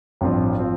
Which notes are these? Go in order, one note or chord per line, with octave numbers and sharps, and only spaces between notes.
A1 G2 F3 C4 F4
F3 C4 F4